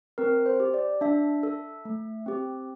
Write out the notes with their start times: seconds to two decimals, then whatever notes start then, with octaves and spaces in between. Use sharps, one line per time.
0.18 C4 A#4
0.46 C5
0.60 G4
0.74 D5
1.01 D4 E5
1.43 A4
1.85 A3
2.26 C4 G4